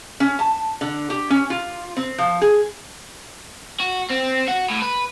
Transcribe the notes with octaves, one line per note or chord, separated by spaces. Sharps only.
C#4
A5
D3
G4
C#4
F4
C4
F3
G#4
F#4
C4
F#4
A2
B4